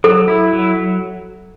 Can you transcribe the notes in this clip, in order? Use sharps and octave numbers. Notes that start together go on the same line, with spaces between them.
F#3 A4
E4
F#3